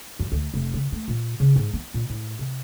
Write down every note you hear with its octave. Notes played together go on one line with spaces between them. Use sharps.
F#2
D2
F1
C#3
A3
A#2
C#3
G#2
B3
A#2
A2
C3